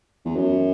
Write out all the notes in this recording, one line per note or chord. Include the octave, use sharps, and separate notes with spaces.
E2
F#2